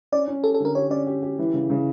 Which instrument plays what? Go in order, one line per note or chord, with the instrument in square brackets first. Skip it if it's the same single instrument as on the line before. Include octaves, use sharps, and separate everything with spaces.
[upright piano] C#4 [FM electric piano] D5
[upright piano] C#4
[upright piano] G4 [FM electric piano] A4
[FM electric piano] A4
[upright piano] D3 [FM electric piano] A#4
[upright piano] G4 [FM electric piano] C#5
[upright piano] C#4 [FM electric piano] D5
[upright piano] G4
G4
E3
C#3
C#3